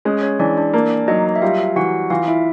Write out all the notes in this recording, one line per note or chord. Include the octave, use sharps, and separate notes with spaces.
G#3 C#4 C#5
C#4 C#5
E3 D4 D5
D4 D5
A#3 D4 D5
F#3 D#4 D#5
E5
G3 F4 F5
E3 F#4 F#5
E3 F4 F5
E4 E5